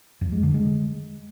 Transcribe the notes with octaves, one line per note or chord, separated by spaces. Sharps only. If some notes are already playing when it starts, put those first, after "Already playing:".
F2
G#3
D3
G#3